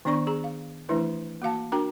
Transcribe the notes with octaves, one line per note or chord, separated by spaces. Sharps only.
D#3 B3 D4 D5 C#6
G#4 A#5
F5
E3 A3 D4 E4 B4
A#3 F#4 F5 A5
D4 F#4 A#4 G5 A#5